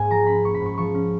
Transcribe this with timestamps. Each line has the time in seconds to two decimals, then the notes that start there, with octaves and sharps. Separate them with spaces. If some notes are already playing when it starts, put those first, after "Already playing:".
Already playing: G#2 A#3 G#5
0.10 F3 A#5
0.27 C#4 B5
0.45 A#3 C#6
0.54 B5
0.61 G#2
0.66 C#6
0.78 F3 C#6
0.95 C#4